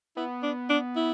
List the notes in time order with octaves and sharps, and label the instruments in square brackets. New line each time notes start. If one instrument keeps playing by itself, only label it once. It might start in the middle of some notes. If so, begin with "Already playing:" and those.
[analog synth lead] B3 [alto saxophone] E4
[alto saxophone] D4
D4
E4